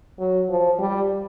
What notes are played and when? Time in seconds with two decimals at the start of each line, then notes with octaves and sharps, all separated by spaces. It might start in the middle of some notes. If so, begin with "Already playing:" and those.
0.19 F#3
0.49 F3
0.79 G3